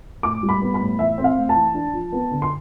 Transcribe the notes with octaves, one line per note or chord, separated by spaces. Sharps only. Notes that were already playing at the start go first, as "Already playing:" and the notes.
A2 D6
G3
B5
B3
B5
A2
E3 E5
C4
F5
A3
A5
E3
D4
F3
B3
D3
C6